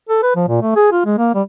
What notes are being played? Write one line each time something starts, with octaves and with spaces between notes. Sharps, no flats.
A4
B4
F3
A#2
A3
G#4
F4
G#3
A#3
G3